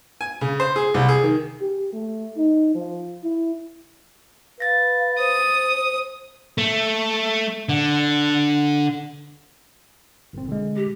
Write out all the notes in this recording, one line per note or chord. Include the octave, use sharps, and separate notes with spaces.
G#5
C#3
C5
G#4
C2
G#4
D#3
G4
A3
D#4
F3
E4
B4 F5 A6 A#6
C5 D#6
A3
D3
G1 C4
D3 G#3
G4